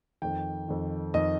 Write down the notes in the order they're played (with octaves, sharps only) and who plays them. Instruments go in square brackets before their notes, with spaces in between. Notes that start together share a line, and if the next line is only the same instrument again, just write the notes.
[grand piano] F2 D#3 G5
F2 D#3
F2 D#3 D#5